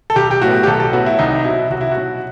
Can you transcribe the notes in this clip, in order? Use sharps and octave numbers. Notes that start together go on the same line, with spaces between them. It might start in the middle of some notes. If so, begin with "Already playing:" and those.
A4
B1 G4
G4
A2 F#3 B3 F#4
G4
B1 A4
A4
A2 F#3 B3 F#4
E4
C2 D#4
B2 F#3 E4
C2 F#4
E4
F#4
B2 F#3